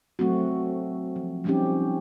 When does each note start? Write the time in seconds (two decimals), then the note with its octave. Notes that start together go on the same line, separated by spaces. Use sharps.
0.19 F#3 A3 C4 F#4
1.16 F3
1.44 F3 G3 C4 C#4 D#4 G4